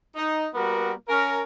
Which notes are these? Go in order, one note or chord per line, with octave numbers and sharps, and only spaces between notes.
D#4
G3 A#3 B3 F#4 A#4
C#4 A#4